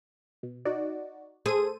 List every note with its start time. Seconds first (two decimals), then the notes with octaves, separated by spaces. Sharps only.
0.43 B2
0.65 D#4 F#4 D5
1.46 G#4 A4 C5 D#7